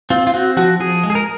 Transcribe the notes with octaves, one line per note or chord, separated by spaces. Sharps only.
C4 F4
F4
C4 F#4
F3 F#4
F3 G#4
G#3
G#4
A#4